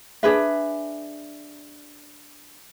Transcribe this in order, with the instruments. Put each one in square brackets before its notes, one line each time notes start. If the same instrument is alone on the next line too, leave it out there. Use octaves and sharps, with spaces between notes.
[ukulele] D4 G#4 B4 E5